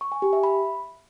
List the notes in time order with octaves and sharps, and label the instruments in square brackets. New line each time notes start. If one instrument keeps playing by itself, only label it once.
[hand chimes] C#6
G#5
G4
E5
B5